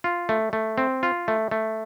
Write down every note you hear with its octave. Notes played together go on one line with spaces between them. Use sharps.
F4
A3
A3
C4
F4
A3
A3